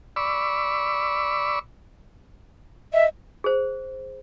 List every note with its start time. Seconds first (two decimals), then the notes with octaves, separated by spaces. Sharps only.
0.16 D5 B5 C#6 E6
2.93 D#5 E5
3.44 G#4 C5